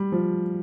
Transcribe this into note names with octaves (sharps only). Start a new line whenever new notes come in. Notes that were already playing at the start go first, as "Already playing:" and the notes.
Already playing: G3
F3